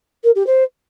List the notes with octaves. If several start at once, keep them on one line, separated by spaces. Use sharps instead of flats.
A#4
G4
C5